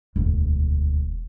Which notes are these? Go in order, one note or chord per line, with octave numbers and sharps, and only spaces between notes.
E1 D2